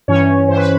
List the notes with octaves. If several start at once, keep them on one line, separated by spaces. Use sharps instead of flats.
G2 E3 C#4 C#5
G2 E3 C5
B4